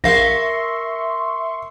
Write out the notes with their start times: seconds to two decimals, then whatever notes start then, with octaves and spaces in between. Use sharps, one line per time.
0.04 A#1 A#4 E5 F5 C6 C#6 A#6